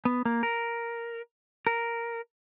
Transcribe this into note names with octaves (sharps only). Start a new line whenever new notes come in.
B3
A#3
A#4
A#4